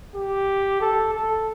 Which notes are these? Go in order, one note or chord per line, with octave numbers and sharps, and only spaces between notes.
G4
A4
A4